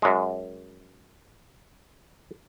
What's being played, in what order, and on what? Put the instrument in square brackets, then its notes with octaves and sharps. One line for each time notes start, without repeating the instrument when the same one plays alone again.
[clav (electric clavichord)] F#2 G#3